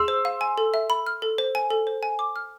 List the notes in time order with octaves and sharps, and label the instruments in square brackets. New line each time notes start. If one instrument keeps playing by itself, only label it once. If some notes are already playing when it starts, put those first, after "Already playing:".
Already playing: [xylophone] G#4 [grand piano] C6 E6
[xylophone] C5
F5
G#5
A4
E5
B5
F6
A4
C5
G#5
A4
C5
G#5
D6
F6